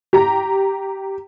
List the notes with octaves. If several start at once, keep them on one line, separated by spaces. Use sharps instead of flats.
G4 A#5